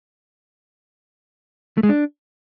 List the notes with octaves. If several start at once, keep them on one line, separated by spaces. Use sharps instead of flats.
A3
G#3
D4